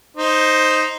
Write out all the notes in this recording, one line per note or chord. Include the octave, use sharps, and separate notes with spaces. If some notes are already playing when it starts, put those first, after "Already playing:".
D#4 C5